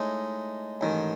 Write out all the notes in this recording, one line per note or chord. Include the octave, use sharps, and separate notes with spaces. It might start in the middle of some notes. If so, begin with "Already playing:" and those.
Already playing: A2 G#3 D#4
A1 G#2 D#3